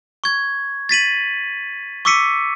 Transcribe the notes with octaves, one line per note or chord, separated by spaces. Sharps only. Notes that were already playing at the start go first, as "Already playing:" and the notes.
C#6 G#6
A6 B6 D#7 F#7
C#6 D6 E6 B6 C#7 D#7